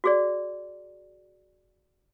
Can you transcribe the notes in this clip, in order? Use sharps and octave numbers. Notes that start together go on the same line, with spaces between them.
F#4 G#4 D5